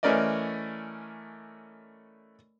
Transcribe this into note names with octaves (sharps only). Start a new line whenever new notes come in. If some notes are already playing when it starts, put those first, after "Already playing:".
E3 A3 C#4 A#4 D5 D#5